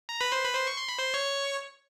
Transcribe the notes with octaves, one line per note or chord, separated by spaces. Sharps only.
A#5
B4 B5
C5 C6
B4 B5
C5 C6
C#6
C6
B5
C5 C6
C#5 C#6